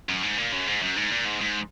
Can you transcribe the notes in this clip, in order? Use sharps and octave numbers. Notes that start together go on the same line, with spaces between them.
F#2
G#2
A#2
F#2
G#2
F#2
G#2
A#2
G#2
G#2